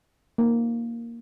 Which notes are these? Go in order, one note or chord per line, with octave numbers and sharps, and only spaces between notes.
A#3